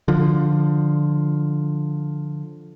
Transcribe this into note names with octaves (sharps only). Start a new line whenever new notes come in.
D3 F3